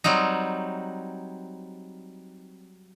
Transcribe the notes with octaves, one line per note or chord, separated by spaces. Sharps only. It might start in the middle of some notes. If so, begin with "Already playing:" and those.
F#3 G3 C4 D#4